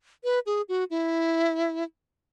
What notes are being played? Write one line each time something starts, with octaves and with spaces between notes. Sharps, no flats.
B4
G#4
F#4
E4